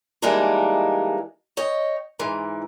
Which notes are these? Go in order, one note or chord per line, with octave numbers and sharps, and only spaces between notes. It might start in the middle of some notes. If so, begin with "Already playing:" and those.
E3 G3 G#3 A#3 D4 D#4
C#5 D#5 G5
G#2 E3